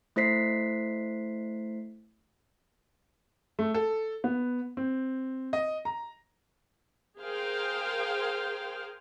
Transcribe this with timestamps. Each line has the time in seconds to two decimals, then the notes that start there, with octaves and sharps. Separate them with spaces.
0.16 A3 E4 C5 B6 C7
3.59 A3
3.74 A4
4.24 B3
4.77 C4
5.53 D#5
5.85 A#5
7.20 G#4 A#4 C5 F5 G5